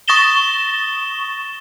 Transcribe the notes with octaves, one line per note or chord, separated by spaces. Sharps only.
C#6 D#6 A6 A#6 E7 G7